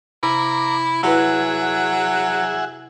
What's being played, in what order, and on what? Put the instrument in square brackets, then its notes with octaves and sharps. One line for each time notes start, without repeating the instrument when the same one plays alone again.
[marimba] C3 [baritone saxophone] E4 [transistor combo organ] A#5 D6
[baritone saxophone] F#3 [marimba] E4 B4 [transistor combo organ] G#4 E5 F#5